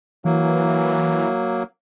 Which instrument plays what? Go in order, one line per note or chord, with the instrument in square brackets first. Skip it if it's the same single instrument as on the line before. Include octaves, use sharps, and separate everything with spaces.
[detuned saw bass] E3 [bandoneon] F#3 A#3